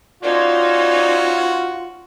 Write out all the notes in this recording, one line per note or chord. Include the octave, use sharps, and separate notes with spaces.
C#4 D#4 F4 F#4 C5 D5